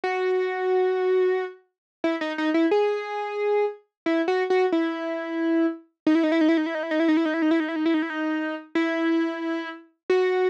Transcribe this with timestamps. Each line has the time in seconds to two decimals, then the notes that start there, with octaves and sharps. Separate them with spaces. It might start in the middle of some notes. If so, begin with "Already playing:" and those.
0.04 F#4
2.04 E4
2.21 D#4
2.38 D#4
2.54 E4
2.71 G#4
4.06 E4
4.28 F#4
4.50 F#4
4.72 E4
6.07 D#4
6.15 E4
6.23 D#4
6.32 E4
6.41 D#4
6.49 E4
6.57 D#4
6.66 E4
6.75 D#4
6.83 E4
6.91 D#4
7.00 E4
7.08 D#4
7.17 E4
7.26 D#4
7.34 E4
7.42 D#4
7.51 E4
7.60 D#4
7.69 E4
7.76 D#4
7.86 E4
7.94 D#4
8.02 E4
8.10 D#4
8.75 E4
10.10 F#4